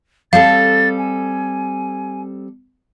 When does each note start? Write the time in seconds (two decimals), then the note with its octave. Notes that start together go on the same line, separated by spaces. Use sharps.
0.33 G3 C4 A4 F5 A6
0.98 G#5